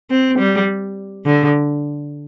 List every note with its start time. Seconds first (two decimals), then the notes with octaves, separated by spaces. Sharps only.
0.10 C4
0.39 G3
1.26 D3